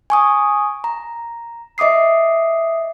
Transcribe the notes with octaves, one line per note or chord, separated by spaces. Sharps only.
G#5 C#6 D#6
A#5
D#5 E5 D6 D#6 C7